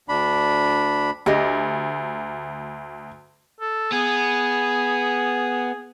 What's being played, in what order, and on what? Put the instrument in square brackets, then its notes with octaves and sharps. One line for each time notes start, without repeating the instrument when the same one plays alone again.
[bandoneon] D2 D4 B5
[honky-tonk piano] D2 [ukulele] G4 D#5
[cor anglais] A4
[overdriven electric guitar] B3 [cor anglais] G#4